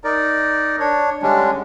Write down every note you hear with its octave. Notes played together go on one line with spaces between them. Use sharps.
D#4 A#4 D5
D4 C#5
D3 G3 G#3 C#4 D4